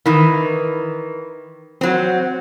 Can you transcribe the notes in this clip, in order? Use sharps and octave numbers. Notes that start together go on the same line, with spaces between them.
D#3 E3
F#3 C4